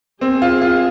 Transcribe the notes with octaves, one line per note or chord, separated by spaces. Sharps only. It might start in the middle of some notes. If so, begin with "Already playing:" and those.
C4 G#4
F4
F4